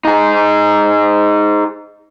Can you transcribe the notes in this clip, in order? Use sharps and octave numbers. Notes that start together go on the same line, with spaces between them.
D#4 G#4